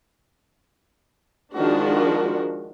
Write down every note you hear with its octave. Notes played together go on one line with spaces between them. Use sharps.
D#3 F3 G#3 D4 F#4